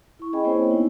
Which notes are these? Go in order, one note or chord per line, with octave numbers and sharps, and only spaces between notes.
E4 C#6
C#4 G#4 D#5 G5 G#5 B5
A#3 C4 E4 C5 C#5
B3 D#4 E4